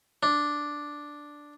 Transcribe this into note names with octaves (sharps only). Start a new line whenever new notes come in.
D4